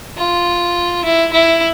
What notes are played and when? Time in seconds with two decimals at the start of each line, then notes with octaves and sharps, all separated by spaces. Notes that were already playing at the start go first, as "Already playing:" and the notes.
0.18 F4
1.04 E4
1.33 E4